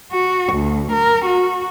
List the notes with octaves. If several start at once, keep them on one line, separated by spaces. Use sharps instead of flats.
F#4
D2
A#4
F#4